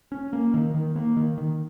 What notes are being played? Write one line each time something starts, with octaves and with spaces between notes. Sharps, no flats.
C#4
A#3
D#3
D#3
A#3
D#3
D#3